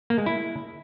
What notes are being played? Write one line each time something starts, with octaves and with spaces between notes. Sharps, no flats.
A#3
G#3
E4